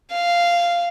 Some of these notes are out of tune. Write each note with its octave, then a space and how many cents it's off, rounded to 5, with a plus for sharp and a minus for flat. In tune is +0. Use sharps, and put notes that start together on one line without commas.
F5 -10